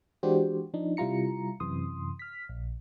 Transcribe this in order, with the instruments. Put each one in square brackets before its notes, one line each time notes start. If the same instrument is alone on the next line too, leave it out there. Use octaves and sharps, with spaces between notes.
[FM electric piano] E3 G#3 D4 F#4 G4 C5
F3 D4 D#4
C3 G3 E4 F4 A#5 C#7
F#2 C3 E3 C6 D#6
F6 B6
A#1